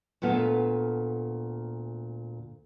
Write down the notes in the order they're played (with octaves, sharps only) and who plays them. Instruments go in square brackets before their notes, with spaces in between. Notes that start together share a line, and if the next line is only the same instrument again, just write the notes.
[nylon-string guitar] D2 A#2 B3 A4 F5